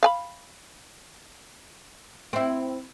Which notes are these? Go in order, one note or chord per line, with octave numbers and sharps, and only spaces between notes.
F5 G#5 B5
C4 E4